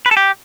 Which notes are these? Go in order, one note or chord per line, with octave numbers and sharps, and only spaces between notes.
B4
A4
G4